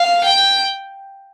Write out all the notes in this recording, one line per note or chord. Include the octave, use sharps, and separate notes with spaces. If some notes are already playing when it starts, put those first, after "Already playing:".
Already playing: F5
G5